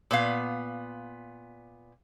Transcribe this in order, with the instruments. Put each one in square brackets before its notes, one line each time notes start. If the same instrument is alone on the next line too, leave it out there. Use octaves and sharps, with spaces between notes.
[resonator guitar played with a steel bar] A#2 B3 F5